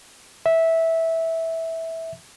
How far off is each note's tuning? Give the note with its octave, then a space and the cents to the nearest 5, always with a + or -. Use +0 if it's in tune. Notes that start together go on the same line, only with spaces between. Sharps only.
E5 -10